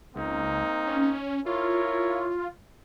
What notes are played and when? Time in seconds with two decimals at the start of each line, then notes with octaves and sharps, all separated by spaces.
0.16 C#2 A#3 C4 D#4
0.87 C#4
1.46 E4 F4 A#4 C#5